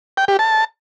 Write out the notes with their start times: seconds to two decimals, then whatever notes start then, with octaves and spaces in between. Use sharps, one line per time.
0.17 G5
0.28 G4
0.39 A5